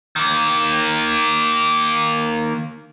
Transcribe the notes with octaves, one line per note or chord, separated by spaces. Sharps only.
D#3 A#3